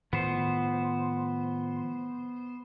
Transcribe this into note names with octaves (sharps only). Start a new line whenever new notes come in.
A2 D#3 F3 B3 C5